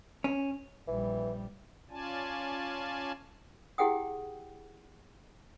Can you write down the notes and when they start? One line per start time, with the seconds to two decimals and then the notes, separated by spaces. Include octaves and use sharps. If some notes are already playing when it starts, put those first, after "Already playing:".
0.24 C#4
0.88 A#1 E3 G3
1.90 C#4 F4 D5 G#5 A5
3.78 E4 G4 G#4 F#5 G5 D#6